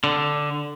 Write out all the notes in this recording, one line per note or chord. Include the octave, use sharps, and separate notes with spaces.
D3